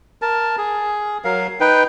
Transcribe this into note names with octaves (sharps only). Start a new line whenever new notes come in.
A#4 A5
G#4
F#3 A#4 F5
D#4 B4 G5